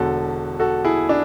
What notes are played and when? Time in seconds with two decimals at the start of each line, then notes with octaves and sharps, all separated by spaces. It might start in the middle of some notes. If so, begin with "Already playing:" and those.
Already playing: E1 E2 D3 F#4 A4
0.60 F#4 A4
0.84 E4 G#4
1.09 D4